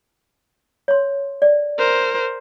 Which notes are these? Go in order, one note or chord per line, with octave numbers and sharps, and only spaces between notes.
C#5 C6
D5
A#4 C5